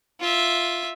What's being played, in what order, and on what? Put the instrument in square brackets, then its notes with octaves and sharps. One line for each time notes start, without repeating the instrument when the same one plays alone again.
[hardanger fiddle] F4 E5